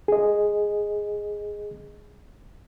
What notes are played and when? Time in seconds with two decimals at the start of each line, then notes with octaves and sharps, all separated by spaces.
0.08 G#4 D#5